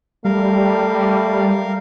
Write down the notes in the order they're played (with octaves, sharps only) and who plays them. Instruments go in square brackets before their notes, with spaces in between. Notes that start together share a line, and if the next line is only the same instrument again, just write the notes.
[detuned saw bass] G3 [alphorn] A3 [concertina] A#4 F5